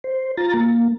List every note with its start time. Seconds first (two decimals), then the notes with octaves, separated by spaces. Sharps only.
0.04 C5
0.37 F4 A#5 A6
0.54 A#3